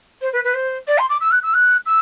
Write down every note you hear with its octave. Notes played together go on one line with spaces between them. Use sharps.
C5
B4
B4
C5
D5
C6
D6
E6
F#6
E6
F#6
E6